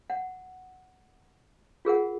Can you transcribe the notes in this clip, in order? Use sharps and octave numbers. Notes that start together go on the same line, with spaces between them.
F#5
F4 G#4 A#4 F#5